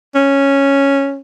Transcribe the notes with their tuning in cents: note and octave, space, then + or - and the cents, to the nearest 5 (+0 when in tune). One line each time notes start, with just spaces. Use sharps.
C#4 -5